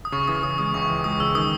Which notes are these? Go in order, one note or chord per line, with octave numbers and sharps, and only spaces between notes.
D#6
C#3 C#6
E3 D#6
C#3 D#6
G#3 D#6
C#2 C#6
E3
G#3 D#6
C#3 E6
D#3 D#6